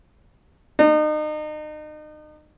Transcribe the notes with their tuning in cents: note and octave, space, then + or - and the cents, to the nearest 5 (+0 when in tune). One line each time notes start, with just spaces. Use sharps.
D#4 -35